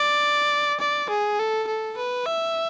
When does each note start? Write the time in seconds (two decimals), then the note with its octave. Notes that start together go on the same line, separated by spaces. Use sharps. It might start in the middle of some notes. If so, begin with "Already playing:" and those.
Already playing: D5
0.80 D5
1.10 G#4
1.39 A4
1.68 A4
1.97 B4
2.26 E5